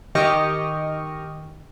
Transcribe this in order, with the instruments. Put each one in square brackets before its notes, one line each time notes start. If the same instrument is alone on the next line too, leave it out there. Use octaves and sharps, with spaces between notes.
[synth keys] D#3 G4 D#5 C#6 F6